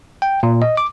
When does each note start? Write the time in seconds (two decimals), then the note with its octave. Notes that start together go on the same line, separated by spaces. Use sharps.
0.22 G5
0.43 A#2
0.62 D#5
0.77 D6